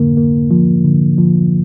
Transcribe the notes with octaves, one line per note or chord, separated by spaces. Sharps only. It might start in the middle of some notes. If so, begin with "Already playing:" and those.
Already playing: D3 A#3
A#3
F3
D3
F3